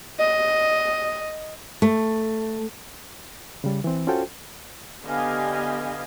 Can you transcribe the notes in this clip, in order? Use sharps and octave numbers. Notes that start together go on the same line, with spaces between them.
D#5
A3
C#3 G3
E3 C4
C#4 F4 F#4 A4 C5 G5
D3 B3 G4 D#5 F5 G#5